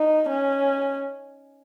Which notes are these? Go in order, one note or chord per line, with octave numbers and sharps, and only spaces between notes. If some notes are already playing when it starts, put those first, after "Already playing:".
Already playing: D#4
C#4